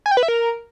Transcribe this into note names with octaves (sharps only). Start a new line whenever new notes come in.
G#5
G5
B4
E5
A#4